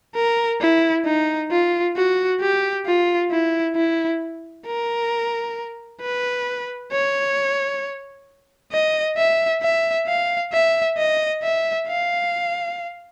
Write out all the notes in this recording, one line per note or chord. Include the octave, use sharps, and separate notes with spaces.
A#4
E4
D#4
F4
F#4
G4
F4
E4
E4
A#4
B4
C#5
D#5
E5
E5
F5
E5
D#5
E5
F5